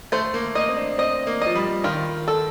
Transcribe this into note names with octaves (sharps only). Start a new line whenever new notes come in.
A3 C5
A#3
A#3 D#5
C4
D4
C4 D#5
A#3
F3 D#5
G3
D#3 F4
A4